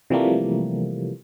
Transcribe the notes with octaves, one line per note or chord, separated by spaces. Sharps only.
C3 E3 F3 G3 A3 A#3